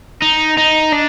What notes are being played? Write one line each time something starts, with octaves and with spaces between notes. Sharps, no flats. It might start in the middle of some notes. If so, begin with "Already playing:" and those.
D#4
D#4
D4